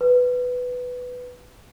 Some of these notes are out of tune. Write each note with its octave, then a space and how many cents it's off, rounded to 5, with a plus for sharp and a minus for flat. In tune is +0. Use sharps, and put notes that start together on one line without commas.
B4 +5